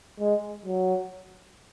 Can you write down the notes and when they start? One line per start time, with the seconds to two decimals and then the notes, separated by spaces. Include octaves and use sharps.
0.19 G#3
0.66 F#3